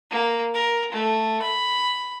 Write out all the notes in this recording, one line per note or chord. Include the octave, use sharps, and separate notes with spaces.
A#3
A#4
A3
B5